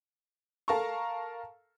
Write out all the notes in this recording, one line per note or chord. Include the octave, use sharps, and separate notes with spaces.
A4 A#4 F5 A5 A#5 C#6